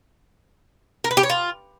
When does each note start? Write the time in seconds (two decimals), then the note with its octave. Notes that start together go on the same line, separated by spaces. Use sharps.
1.04 A#4
1.11 B4
1.17 G4
1.23 C#5
1.30 F4